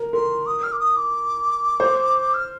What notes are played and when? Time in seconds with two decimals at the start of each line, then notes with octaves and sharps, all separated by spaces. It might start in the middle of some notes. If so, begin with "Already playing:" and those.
Already playing: A#4
0.13 A#4 C6
0.46 D#6
0.63 F6
0.72 D6
0.79 D#6
0.96 D6
1.80 C5
2.34 F6